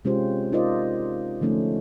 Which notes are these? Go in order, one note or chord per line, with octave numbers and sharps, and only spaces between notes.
C3 G#3 C#4 F4 G4 C5
D#4 F4 A#4 C5 D5 D#5
D3 F3 A3 C#4 D#4